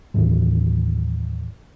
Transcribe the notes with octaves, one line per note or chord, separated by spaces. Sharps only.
D#2 A2 E3 F#3